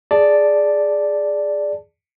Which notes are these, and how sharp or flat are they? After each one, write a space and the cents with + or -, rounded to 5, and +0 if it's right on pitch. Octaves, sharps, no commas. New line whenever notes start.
G#4 +0 D5 +0 A5 +0